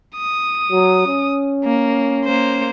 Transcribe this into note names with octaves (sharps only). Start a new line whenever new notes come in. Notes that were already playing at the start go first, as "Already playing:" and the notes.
D#6
F#3
C#4
A#3
A#3 C5